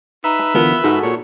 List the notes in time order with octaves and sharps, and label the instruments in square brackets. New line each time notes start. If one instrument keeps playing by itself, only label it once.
[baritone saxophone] D#4 [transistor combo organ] B4 E5
[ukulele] A5
[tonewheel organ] D3 E3 [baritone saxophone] B3 [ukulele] F4 A#4 A5
[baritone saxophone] G#2 [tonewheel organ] F#4 G#4 A4
[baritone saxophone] A#2 [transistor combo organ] C#5 [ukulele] A5